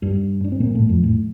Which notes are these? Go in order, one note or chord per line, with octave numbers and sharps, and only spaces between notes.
G2 G3
D4
C4
A#2 A#3
A2 A3
F2 F3
A2 A3